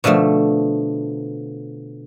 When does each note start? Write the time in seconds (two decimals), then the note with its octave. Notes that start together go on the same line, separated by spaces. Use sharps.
0.04 B2 D3 F3 A3